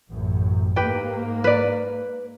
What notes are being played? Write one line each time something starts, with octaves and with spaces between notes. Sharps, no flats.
A1 F#2
G#2 A#3 G4 B4 G5
B4 D5